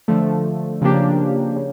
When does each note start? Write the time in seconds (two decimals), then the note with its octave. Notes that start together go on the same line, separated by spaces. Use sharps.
0.08 D3 F3 A3
0.81 C#3 F3 A#3 D4 G4
1.56 C#3